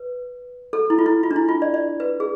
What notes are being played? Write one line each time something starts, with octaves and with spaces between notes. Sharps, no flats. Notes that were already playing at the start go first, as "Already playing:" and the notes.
Already playing: B4
A4
E4
F4
E4
F4
D4
E4
F4
D5
D5
B4
G#4